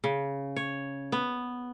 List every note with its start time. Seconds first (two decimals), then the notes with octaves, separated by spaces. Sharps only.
0.04 C#3
0.56 C#5
1.12 B3